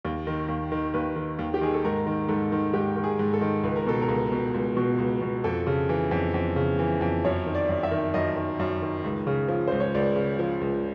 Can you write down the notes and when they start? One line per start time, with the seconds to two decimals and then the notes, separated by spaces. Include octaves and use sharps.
0.05 D#2
0.27 D#3
0.48 D#2
0.72 D#3
0.94 D#2 B4
1.16 D#3
1.39 D#2
1.54 G4
1.61 D#3 G#4
1.74 A4
1.85 G#2 A#4
2.07 D#3
2.28 G#2 A4
2.52 D#3
2.74 G#2 G4
2.96 D#3
3.04 G#4
3.19 G#2
3.33 A4
3.41 D#3
3.64 C#2 B4
3.76 A#4
3.87 B2 A4
4.02 A#4
4.08 C#2
4.32 B2
4.54 C#2
4.77 B2
4.98 C#2
5.22 B2
5.44 F2 A4
5.67 C#3
5.89 E3
6.11 F2
6.34 F2
6.56 C#3
6.79 E3
7.01 F2
7.24 F#2 C#5
7.46 D#3
7.55 D5
7.69 F#2
7.83 E5
7.91 D#3
8.14 F#2 D#5
8.36 D#3
8.59 F#2
8.82 D#3
9.04 C#2
9.27 C#3
9.48 F3
9.68 C#2 C5
9.80 C#5
9.94 C#2 D5
10.16 C#3
10.39 F3
10.61 C#2